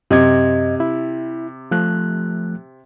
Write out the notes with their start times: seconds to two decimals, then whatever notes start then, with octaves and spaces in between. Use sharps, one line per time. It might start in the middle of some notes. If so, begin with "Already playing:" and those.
0.11 F#2 C3 D#5 G#6
0.80 E4
1.71 F3 A3 F#6